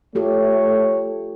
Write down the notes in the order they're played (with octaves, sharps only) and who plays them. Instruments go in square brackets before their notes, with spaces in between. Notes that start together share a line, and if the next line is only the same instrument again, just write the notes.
[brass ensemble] A3 C#5 [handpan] F4 G4 A4